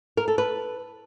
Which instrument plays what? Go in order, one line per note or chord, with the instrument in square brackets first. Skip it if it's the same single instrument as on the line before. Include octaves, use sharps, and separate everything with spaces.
[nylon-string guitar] A#4
A4
B4